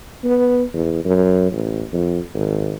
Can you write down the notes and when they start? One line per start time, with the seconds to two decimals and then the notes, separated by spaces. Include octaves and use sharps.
0.24 B3
0.73 E2
1.05 F#2
1.52 A1
1.93 F2
2.34 G#1